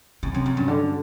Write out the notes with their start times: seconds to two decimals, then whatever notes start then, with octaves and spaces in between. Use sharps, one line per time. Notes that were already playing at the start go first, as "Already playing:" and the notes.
0.23 F#2 C3
0.34 F2
0.46 F#2
0.57 G2
0.68 D3